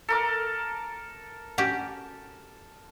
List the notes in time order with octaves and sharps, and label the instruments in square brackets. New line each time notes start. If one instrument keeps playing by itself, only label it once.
[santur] A4 A#4 D6
[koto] C#4 F#4 G4